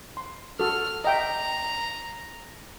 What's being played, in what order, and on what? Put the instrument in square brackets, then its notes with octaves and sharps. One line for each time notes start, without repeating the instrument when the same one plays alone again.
[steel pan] C6
[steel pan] F#4 A4 [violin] F6
[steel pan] D#5 E5 G5 [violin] A#5